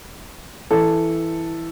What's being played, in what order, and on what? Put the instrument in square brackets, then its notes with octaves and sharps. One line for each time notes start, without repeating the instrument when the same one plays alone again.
[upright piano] E3 A4